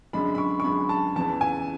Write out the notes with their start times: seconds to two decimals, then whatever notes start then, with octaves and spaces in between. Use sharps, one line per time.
0.13 F#2 D3 G#3 D4 B5
0.35 B5
0.38 C#6
0.60 C#6
0.64 F#2 D3 G#3 D4 B5
0.89 A5
1.16 E2 C#3 E3 A5
1.41 G#5